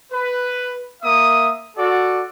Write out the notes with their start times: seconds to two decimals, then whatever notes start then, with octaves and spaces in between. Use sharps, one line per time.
0.11 B4
1.03 A#3 E5 D#6
1.77 F#4 A4 D5